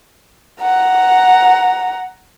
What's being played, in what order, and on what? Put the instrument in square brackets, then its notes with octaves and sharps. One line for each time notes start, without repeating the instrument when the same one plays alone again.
[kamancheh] F#5 A#5